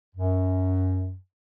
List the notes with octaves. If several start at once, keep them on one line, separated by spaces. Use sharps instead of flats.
F#2